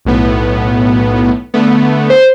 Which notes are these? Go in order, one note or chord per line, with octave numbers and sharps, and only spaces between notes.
B1 A2 B3
D3 A3 B3
C5